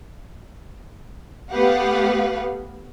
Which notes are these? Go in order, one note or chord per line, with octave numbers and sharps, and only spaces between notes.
A3 B3 G4 B4 F5 F#5